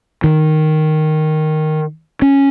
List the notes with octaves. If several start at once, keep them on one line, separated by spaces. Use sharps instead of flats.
D#3
C#4